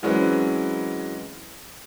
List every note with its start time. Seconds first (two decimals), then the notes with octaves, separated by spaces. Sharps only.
0.03 E3 F#3 G#3 C4 C#4 B4